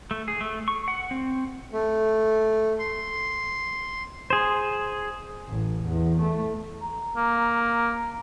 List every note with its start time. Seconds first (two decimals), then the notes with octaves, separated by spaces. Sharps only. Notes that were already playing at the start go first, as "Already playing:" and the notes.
0.11 A3
0.28 G#4
0.41 A3
0.68 C#6
0.88 F#5
1.11 C4
1.73 A3
2.79 C6
4.30 G#4 C5
5.48 A1
5.85 E2
6.21 A3
6.81 A#5
7.16 A#3